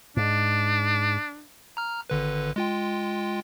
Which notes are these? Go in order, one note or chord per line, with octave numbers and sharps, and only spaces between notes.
G#2 D4
A#5 F6
G#1 D3 B4
G#3 F4 G5